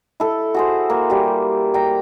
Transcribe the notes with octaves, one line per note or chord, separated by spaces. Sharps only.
E4 A4
F#4 G#4 C5
A#3
G3 G4
G5 A#5